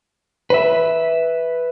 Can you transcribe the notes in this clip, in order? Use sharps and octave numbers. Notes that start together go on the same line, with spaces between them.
B4 E5